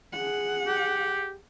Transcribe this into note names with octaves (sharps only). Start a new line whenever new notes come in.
G#4 F#5
G4